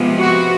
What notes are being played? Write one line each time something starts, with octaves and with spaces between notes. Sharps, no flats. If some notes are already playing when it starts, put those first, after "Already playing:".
Already playing: C3 F3 G#3 B3
F#4